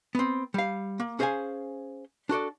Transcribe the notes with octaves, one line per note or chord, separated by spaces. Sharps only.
B3 C4
G3 F5
A#3
C#4 G#4 C5 D5 F5 G#5
D4 F#4 A4 D5